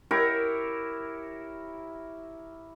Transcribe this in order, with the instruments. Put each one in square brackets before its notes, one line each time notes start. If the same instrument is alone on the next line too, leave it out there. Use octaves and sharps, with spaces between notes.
[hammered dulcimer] E4 G4 A#4 C#5